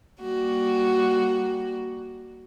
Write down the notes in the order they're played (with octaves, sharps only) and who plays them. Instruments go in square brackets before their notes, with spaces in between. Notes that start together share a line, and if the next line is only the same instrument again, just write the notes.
[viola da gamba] G3 A#3 F#4